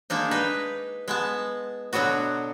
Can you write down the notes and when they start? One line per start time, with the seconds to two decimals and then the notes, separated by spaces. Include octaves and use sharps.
0.10 G#3 A#3 D4 D#4
0.31 D#4 B4
1.08 G#3 B3 A5
1.93 B2 D3 F#3 B3 F#4